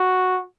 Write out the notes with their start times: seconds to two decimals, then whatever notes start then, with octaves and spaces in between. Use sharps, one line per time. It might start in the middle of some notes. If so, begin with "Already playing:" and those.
Already playing: F#4